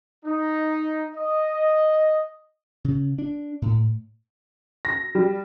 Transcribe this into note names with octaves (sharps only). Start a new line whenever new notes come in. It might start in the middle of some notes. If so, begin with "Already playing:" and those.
D#4
D#5
C#3
D4
A2
A#6
G3